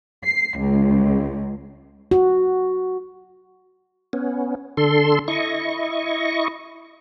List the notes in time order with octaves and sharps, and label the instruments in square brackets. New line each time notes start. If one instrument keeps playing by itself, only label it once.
[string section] C7
C#2
[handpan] F#4
[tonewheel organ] B3 C#4
D3 A4 C6
E4 D#5 C#6